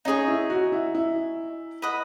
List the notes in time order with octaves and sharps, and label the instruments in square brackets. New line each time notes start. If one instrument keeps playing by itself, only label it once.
[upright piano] C#4 [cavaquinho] D#4 G#4 C#5
[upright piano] E4
F#4
E4
E4
[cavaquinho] B4 D#5 F#5 B5